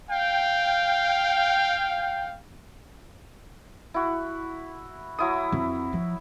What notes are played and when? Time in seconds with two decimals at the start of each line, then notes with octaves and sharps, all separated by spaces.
0.10 F5 G5
3.94 E4 F#4
5.19 F#3 E4 D#6
5.52 F2
5.93 F3